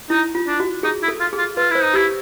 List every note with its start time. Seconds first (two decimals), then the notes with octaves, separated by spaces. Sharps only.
0.10 D#4 E4
0.35 F4
0.47 D4
0.60 F#4
0.83 D#4 G#4
1.03 E4
1.08 A4
1.20 F4
1.33 G#4
1.38 F4
1.57 F4 B4
1.70 E4 C5
1.83 D#4
1.94 E4 G4